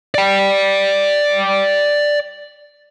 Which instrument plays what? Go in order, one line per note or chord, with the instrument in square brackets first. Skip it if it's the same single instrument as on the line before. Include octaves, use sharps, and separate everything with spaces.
[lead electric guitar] D5 G5